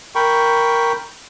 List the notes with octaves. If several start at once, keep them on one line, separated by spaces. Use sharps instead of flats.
A#4 G5 B5 C#6